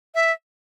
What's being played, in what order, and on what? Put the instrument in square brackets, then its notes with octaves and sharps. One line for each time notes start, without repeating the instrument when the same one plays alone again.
[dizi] E5